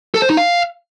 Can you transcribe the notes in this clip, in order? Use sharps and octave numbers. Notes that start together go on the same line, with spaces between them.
A4
C5
D#4
F5